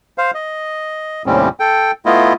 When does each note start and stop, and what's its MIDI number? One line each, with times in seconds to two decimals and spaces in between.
0.18 0.31 72
0.18 0.31 77
0.34 1.23 75
1.26 1.49 39
1.26 1.49 45
1.26 1.49 48
1.26 1.49 55
1.26 1.49 60
1.26 1.49 61
1.60 1.92 69
1.60 1.92 79
2.06 2.33 57
2.06 2.33 59
2.06 2.33 64
2.06 2.33 65
2.06 2.33 75